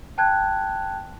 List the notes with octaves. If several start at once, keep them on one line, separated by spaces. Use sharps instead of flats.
G5 A5 F#6 G#6